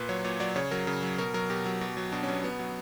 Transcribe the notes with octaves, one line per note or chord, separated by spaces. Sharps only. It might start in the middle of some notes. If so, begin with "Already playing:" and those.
Already playing: A#2 B4
F#3 C#5
A#2 C#5
F#3 D5
C#3 C#5
F#3 A#4
C#3
F#3
B2 A#4
F#3 A#4
B2 G4
F#3
B2
F#3
B2 D4
C#4
F#3
B3
B2 B3
F#3